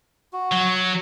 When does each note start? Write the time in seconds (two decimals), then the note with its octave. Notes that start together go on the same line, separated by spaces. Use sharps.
0.33 F#4
0.52 F#3